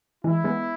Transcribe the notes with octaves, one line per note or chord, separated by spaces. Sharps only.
E3 G#3 E4
G#3 B3